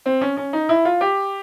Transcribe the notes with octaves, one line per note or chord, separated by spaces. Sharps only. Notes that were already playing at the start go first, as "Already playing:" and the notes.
C4
C#4
C#4
D#4
E4
F4
G4